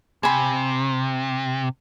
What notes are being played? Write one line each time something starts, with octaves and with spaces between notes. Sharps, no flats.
C3 G#5 B5